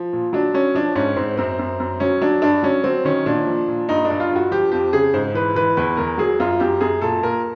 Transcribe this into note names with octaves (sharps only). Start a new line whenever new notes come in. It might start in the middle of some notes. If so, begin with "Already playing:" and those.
Already playing: F3
A#2
F#3 D4
F#3 C#4
F3 D4
G#2 C#4
G#2 C4
F#2 C4
F#2
F#2
F#3 C#4
F#3 D4
G2 D4
F#3 C#4
F#3 C4
D#3 C#4
A#2 D4
F3
A#2
G2 D#4
D4
G2
F4
G2
F#4
F3 G4
F2 G4
C#3 G#4
G#2 C5
E3 B4
E3 B4
E2 B4
E2 A#4
F#3 G#4
F#2 F4
F#2 G4
F#2 G#4
A#2 A4
A#2 A#4